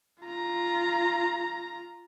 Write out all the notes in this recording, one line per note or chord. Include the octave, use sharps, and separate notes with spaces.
F4 A#5